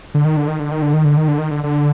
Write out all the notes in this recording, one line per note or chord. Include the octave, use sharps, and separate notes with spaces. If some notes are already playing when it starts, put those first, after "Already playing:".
D3
D#3
D3
D#3
D3
D#3
D3
D#3
D3
D#3
D3
D#3
D3
D3